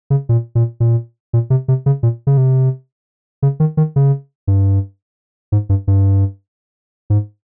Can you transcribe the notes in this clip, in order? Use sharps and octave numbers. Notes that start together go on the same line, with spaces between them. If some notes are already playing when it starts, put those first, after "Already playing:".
C#3
A#2
A#2
A#2
A#2
C3
C3
C#3
A#2
C#3
C3
C#3
D#3
D#3
C#3
G2
G#2
G2
G2
G#2